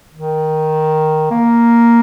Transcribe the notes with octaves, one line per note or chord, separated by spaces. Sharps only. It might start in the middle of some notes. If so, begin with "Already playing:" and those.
D#3
A#3